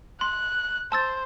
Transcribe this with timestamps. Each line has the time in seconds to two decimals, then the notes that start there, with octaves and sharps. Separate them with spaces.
0.21 C6 F#6
0.92 C5 A5 E6 A6